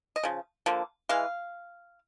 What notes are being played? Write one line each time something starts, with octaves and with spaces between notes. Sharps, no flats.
D#5
C#3 F3
D3 F3 A#3
E3 G#3 F5